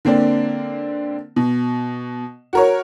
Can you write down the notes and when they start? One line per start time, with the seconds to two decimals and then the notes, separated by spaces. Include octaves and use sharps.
0.05 D3 A#3 C4 D4
1.36 B2
2.53 F#4 A#4 C#5